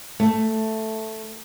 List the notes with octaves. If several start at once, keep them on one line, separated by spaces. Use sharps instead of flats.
A3